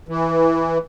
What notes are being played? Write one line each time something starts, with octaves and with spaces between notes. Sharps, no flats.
E3